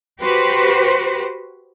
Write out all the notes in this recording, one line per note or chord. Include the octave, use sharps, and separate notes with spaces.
F#4 G4 B4 C5